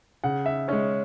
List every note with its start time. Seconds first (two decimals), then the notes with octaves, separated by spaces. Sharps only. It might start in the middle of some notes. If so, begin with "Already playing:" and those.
0.24 C#3 F#5
0.46 E5
0.68 G#3 C#4 C#5